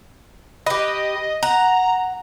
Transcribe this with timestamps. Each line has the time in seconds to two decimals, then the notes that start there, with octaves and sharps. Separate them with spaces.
0.66 G4 B4 D#5
1.43 F#5 A#5